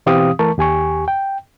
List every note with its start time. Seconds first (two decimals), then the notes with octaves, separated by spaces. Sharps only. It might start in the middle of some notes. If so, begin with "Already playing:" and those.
0.06 B2 E3 C4 G4 F5 D#6
0.39 E3 A3 A#4 A5 C#6
0.58 D#2 G4 G#5 C#6
1.08 G5